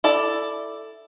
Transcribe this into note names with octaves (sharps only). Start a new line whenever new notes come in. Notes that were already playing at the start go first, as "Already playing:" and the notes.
E4 A4 D5